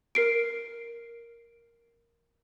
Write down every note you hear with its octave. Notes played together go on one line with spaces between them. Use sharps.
A#4 C7 D7